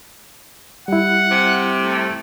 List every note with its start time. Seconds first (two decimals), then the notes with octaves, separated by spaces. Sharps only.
0.88 G3 E4 F#5
1.31 C3
1.83 A3